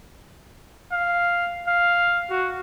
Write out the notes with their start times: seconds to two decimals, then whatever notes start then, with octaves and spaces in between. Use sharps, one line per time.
0.92 F5
1.67 F5
2.30 F#4